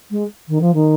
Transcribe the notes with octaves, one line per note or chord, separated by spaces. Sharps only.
G#3
D#3
F3
D#3